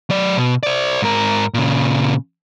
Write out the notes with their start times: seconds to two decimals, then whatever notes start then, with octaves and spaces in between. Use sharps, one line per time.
0.10 F#3 D5
0.37 B2
0.63 C5 D5
1.02 G#2 A#4
1.54 A#2 C#3